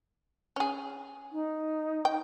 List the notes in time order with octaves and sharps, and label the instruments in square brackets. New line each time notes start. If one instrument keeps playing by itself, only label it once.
[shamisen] C#4 G#4
[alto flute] D#4
[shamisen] G5